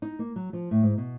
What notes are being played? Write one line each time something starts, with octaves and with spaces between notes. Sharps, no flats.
D#4
A#3
F#3
F3
A2
G#2
B2